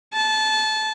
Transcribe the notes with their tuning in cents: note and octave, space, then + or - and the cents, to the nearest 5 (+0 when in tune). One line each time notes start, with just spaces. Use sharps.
A5 -20